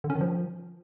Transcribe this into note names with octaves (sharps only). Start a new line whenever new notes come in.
D3
C#4
D#3
F3